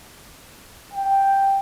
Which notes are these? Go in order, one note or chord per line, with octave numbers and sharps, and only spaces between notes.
G5